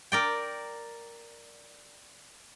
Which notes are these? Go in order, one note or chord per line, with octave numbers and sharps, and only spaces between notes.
A#4 D5 G5